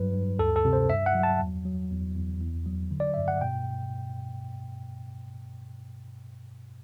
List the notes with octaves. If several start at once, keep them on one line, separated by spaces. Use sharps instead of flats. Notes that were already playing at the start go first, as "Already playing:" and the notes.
Already playing: G2 F#3 B4
G2
D2 A4
A4
C3
C5
G2 E5
F#5
F#3
A5
E2
F#3
E2
E2
E2
F#3
D3
D5
G2 E5
F#5
B2 G5